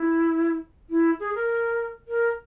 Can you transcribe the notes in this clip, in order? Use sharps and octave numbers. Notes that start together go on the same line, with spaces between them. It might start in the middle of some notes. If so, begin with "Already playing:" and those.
Already playing: E4
E4
G#4
A#4
A#4